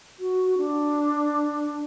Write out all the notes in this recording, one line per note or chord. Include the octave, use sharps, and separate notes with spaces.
F#4
D4